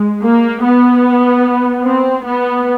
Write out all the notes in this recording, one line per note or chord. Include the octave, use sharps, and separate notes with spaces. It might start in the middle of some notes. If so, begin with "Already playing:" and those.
Already playing: G#3
A#3
B3
C4
B3